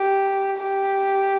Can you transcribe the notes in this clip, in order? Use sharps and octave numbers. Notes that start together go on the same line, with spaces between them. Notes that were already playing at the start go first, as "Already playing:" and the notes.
Already playing: G4
G4